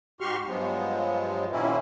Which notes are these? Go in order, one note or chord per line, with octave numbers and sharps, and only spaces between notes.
G#2 F#4 G4 C6 C#6 F6
G2 F3 F#3 G#3 B3
A#2 D#3 A#3 C4 C#4 E4